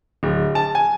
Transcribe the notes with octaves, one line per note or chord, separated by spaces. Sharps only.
D1
A5
G#5